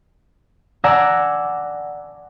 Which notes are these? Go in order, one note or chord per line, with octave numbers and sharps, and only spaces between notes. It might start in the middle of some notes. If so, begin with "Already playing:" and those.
D5 F#5 G#5 A#5 E6